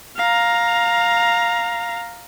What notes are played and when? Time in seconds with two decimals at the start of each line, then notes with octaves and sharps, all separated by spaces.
0.16 F5 A#5